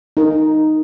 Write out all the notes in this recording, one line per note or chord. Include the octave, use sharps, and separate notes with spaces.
D#4 A#4